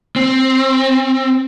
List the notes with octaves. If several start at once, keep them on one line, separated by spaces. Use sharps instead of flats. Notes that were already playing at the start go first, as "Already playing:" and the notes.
C4